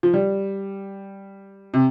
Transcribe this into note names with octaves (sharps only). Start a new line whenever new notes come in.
F3
G3
C3